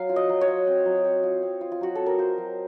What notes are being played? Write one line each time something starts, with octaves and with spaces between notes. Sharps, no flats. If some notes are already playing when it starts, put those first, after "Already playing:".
Already playing: F#3 F5
F4
D#5
F#3
C#5
F4
C4
F#3
C4
F4
C4
F4
F4
F#3 F#4
C4 A4
A#4
F4 C5
F#3